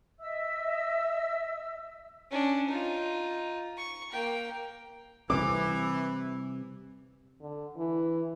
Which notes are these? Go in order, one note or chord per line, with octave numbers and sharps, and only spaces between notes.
D#5 E5 E6
C#4 D4
D#4 F4
C#6
A#3 G5
C3 E3 G3 C4 D6
D3
E3